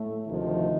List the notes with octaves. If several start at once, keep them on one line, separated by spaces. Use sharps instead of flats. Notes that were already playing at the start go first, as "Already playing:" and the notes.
Already playing: A2 A3
D2 C3 D#3 F3 D#4